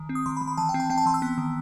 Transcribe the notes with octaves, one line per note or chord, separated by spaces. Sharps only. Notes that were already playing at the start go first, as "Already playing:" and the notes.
Already playing: D#3
C4
D#6
D#3 C6
B5
D#3
B5
E3 A5
G5
C4
A5
C4 G5
A5
E3 C6
E6
B3
D#3